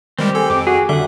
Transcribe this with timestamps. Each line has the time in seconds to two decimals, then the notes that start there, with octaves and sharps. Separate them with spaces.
0.19 D#3 G3 G#3 C4 G4
0.35 G#4 A4
0.50 F2 D6
0.67 F#4 G#4
0.89 D3 G3 E5 F#5